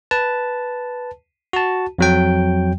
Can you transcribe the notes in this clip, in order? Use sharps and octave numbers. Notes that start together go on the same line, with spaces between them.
B4 A5
F#4 A5
F2 F#3 G5